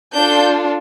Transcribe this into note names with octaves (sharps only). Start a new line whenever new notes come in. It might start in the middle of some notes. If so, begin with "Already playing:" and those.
D4 F4 A4 G6